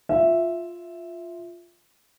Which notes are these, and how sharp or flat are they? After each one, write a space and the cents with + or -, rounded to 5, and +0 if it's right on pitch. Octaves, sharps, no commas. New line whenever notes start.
F4 +0 E5 +0